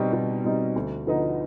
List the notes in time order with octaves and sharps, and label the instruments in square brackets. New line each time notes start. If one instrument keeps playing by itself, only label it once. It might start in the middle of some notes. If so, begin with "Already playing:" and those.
Already playing: [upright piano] B2 G3 C4 D#4
B2
G3 C4 D#4
D2
D3 F3 B3 D#4